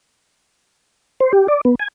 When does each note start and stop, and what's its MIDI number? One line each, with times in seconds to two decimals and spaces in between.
1.20 1.32 72
1.33 1.47 67
1.48 1.61 74
1.65 1.75 59
1.80 1.88 80